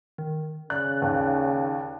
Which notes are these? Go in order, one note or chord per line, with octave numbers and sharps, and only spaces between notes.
D#3
C#3 D5 F#6
D#2